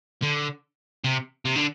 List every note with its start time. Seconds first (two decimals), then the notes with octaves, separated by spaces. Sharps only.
0.23 D3
1.05 C3
1.45 C3
1.55 D3